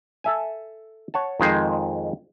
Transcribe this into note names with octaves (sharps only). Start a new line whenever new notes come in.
A4 E5 G#5
C#5 F#5 A5
F2 D#3 G#3 C5 G#5